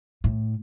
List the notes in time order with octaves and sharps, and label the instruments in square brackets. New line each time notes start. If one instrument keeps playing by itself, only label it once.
[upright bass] A2